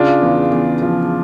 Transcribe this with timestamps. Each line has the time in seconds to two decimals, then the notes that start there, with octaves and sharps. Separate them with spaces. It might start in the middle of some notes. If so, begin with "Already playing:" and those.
Already playing: C#3 D4 F4
0.22 E2
0.52 E2
0.82 F3